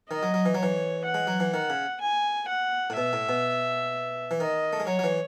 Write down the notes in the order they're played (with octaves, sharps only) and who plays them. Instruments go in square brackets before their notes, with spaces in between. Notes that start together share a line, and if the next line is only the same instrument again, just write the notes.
[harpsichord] D#3 [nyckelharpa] D#5
[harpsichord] F#3
F#3
E3
F#3
[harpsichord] E3 [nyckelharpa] C#5
[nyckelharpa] F#5
[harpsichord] G#3
F#3
E3
[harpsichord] D#3 [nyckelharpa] F#5
[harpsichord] C#3
[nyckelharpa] G#5
F#5
[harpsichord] A2
[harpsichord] B2 [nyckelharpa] E5
[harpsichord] A2
B2
E3
[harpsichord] D#3 [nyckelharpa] D#5
[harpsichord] A3
G#3
[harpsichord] F#3 [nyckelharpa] C#5
[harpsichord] F#3
E3